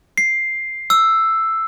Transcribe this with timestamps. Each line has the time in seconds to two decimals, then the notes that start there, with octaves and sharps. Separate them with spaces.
0.18 C7
0.90 E6